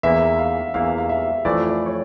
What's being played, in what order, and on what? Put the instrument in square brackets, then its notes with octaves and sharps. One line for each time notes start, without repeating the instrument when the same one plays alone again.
[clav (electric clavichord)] E2 E3 A#3 E4 [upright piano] E5
[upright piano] F5
[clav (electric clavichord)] E2 E3 A#3 E4 [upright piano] F5
[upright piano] F5
E5
[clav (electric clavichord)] F2 E3 A3 E4 [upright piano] D5
[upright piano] D5
C#5